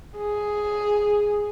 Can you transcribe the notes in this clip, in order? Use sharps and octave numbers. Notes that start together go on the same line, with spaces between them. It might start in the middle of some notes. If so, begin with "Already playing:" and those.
G#4